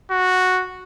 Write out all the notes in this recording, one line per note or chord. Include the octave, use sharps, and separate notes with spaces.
F#4